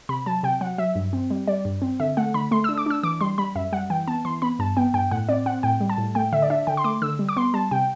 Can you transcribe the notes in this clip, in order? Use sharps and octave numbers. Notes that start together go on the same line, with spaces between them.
C3 B5
F#3 A5
C3 G5
F#3 F#5
F#3 E5
G2
C4
G3
G3 D5
G2
C4
D3 E5
A3 F#5
D3 B5
A3 C6
E6
D4
D6
D4 E6
E3 D6
G3 C6
G3 B5
F#2 E5
G3 F#5
E3 G5
B3 A5
E3 C6
B3 B5
G2 A5
B3 G5
G2 G5
A2 F#5
C4 D5
C4 F#5
A2 G5
G3
A5
A2
A3 G5
D3 E5
D5
D4 E5
D3 G5
C6
A3 D6
D3 E6
G3
D6
B3 C6
G3 A5
C3 G5